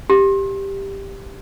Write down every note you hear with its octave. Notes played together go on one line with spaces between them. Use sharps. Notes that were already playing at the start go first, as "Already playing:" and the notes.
G4